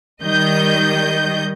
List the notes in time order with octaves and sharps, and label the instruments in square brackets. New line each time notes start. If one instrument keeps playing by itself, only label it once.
[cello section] D#3 G3 [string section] D#5 G6